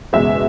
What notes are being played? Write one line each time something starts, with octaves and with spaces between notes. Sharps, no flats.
F#1 E2 B2 G#3 E5